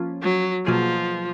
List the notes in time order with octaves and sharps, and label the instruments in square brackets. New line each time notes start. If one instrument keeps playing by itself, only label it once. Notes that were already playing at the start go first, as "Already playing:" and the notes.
Already playing: [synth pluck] F3 A#3 C#4 F4
[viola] F#3
[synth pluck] B2 F#3 A#3 F4 G#4 [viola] F3